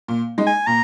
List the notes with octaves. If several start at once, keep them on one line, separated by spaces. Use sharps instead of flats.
A#2
G#3 D#4
G#5
A#2 A#5